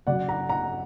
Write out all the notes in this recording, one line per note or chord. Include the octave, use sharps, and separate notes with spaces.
C#3 F#3 D5 F#5
F#5 A#5
F#5 A#5